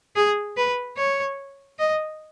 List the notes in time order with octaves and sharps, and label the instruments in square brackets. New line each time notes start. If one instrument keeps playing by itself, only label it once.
[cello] G#4
B4
C#5
D#5